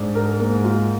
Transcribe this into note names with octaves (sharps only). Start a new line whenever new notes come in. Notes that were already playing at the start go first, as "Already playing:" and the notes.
Already playing: G#2 D4
A#4
A#3
F4